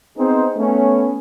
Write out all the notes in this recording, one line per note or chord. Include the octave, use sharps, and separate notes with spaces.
B3 C4 D#4 G#4 C5
A3 B3 C#4